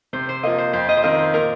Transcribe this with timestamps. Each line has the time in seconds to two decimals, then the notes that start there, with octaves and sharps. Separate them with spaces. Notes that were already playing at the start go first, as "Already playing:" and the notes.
0.13 C3 C5
0.29 C5
0.43 F3 A#3 D#5
0.58 C5
0.73 F2 C5
0.89 D#5
0.97 C5
1.03 D#3 C4 F4 A#4 D#5
1.19 C5
1.34 A#2 A#4